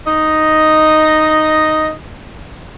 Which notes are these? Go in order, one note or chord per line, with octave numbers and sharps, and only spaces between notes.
D#4 D#5